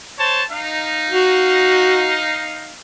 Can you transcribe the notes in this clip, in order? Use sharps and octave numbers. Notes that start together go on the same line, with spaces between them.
C5 C#5 A5
D#4 F5
F#4